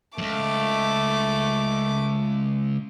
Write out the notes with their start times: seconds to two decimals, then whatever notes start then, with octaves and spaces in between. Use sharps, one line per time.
0.18 C#2 F#2 A3 D6